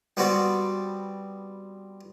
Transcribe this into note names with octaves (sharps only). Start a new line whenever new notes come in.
G3 B3 C4 F#4 D5